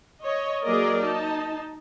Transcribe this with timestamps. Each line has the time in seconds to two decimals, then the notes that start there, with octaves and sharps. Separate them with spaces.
0.23 C#5 D#5
0.62 F#3 A#3 G#4 A#4 D5 D#5
0.99 D#4 A5